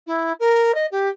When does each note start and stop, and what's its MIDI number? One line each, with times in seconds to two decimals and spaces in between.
0.06 0.32 64
0.39 0.74 70
0.74 0.86 75
0.91 1.08 67